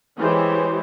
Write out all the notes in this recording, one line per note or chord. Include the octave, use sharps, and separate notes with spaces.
E3 G#3 G4 C5 C#5